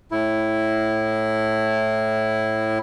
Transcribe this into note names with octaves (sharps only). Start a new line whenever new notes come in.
A2 E4